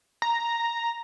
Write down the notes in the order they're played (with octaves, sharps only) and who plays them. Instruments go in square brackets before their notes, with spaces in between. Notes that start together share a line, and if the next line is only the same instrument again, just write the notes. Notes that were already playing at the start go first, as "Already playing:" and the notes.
[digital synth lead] A#5